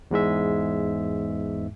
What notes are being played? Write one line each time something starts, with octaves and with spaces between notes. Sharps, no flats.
E2 G#2 G#3 E5